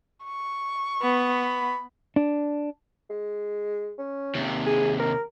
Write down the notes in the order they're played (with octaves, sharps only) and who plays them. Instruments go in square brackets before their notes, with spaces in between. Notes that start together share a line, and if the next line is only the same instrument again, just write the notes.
[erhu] C#6
[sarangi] B3 [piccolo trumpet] B5
[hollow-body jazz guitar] D4
[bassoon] G#3
C#4
[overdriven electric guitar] D#2 C3
[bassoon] G#4
A#4